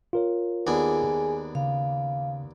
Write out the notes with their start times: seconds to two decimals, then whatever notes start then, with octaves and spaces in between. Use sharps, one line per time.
0.13 F4 A#4 C#5
0.67 D#2 B3 D4 G#4 G#5
1.55 C#3 F5